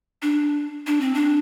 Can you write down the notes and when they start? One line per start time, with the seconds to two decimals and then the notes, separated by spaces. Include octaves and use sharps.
0.22 D4
0.87 D4
1.01 C4
1.14 D4